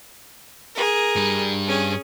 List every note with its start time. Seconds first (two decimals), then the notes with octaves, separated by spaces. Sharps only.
0.75 G#4 A#4
1.16 G2 G3
1.67 C#4 G#4